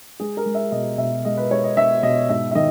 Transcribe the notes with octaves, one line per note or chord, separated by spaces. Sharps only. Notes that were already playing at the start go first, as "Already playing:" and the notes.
G#3 G#4
A#4
G#3
E5
B2 D#5
B2 E5
G#3 D#5
B4
G#3 C#5
D#5
B2 E5
B2 D#5
G#2 E5
E5
D#3 D#5